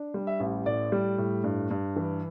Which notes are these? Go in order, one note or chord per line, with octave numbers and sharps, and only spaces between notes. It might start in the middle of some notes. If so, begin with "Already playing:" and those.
Already playing: D4
G3
E5
A1
A2 D5
G3
A2
G2
G2
E3